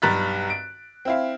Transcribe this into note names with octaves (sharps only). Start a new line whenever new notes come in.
B1 G2 A#5 F#6 A6 B6
D7
C4 E4 F5